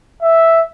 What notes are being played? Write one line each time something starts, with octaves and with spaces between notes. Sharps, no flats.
E5